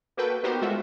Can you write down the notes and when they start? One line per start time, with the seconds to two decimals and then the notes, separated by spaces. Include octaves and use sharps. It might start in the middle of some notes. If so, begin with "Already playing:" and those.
0.17 A#3 F#4 A4 B4 G5
0.43 B3 D#4 F#4 G4 A#4 C5
0.62 G#3 F4 F#4 A4 E5